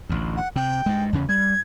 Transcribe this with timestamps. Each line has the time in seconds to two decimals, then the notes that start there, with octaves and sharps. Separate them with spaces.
0.09 A1 D2
0.36 F#5
0.56 C3 G5
0.86 G2 G#3
1.13 E2 C#3 C#4
1.29 G3 G#6